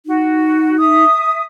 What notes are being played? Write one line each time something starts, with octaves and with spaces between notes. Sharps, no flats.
D#4 F#4
E5 D#6